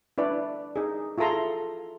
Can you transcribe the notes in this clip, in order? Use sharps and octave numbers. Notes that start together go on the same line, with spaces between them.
D4 E4 B4 D5
D#4 G#4
E4 F4 G#4 A4 A#5 C6